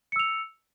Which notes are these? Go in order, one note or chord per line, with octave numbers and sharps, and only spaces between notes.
E6 C#7 F7